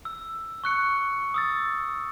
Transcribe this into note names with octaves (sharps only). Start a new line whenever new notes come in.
E6
C#6 F#6 C#7
D#6 E6 A6